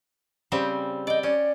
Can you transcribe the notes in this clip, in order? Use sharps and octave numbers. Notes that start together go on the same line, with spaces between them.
C#3 G3 C4
D5 D#5 G5
C#4 D5